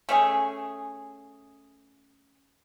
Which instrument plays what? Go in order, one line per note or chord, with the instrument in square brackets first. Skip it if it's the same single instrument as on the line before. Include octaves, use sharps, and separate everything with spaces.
[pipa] A3 C#4 G#4